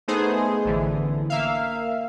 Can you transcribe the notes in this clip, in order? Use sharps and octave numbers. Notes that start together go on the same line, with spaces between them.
A3 B3 D#4 G#4 C5
A1 D3 E3
A#3 E5 F5